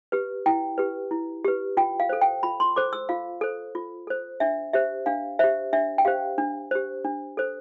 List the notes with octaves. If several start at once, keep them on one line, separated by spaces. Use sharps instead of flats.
G4 B4
E4 G5
G4 B4
E4
G4 B4
F4 G5
F5
A4 C5
G5
F4 B5
C6
A4 C5 D6
E6
F4 F5
A4 C5
F4
A4 C5
D4 E5
G4 C5 E5
D4 F5
G4 C5 E5
D4 E5
G5
G4 C5 F5
D4
G4 C5
D4
A4 C5